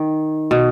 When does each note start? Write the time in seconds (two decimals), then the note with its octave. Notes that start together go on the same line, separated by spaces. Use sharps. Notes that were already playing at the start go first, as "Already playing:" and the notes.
Already playing: D#3
0.51 B2